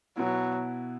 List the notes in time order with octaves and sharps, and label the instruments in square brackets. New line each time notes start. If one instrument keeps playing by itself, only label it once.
[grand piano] B2 B3 E4 [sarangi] F#3